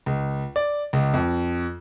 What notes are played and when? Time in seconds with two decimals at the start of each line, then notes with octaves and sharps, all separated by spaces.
0.06 C#2
0.56 D5
0.93 C#2
1.14 F2